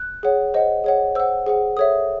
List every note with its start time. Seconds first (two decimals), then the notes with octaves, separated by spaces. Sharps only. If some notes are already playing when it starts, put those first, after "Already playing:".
Already playing: F#6
0.23 G#4 C#5 F#5
0.54 C5 D#5 F#5
0.84 G#4 C#5 F#5
1.15 C5 F#5 E6
1.47 G#4 C5 F#5
1.77 A4 C#5 E5 D#6